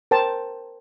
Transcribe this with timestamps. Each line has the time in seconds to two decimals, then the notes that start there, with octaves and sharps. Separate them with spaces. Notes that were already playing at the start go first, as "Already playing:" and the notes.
0.11 A#4 C5 G5 A5